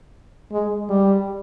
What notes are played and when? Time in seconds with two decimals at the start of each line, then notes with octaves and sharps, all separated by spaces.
0.52 G#3
0.89 G3